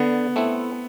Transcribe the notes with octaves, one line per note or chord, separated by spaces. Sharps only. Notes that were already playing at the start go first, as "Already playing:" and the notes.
Already playing: D3 B3
A3 C4 E4